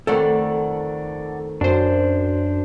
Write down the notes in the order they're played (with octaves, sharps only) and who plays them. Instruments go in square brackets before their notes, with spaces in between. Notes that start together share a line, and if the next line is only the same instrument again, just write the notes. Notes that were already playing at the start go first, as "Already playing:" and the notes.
[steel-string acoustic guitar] F2 D#3 A3 [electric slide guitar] A4 D5 F#5
[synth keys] F#2 C5 [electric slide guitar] D4